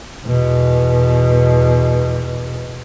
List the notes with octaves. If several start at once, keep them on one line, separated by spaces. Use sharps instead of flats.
E2 B2